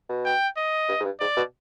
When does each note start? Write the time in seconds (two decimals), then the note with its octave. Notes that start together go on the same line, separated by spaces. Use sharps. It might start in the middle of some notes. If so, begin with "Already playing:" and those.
0.09 B2
0.26 G5
0.57 D#5
0.89 G2
1.00 G#2
1.05 G2
1.20 G#2 D5
1.37 B2